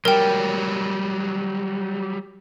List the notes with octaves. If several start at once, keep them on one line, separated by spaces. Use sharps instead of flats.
F#3 G3 A#4 G5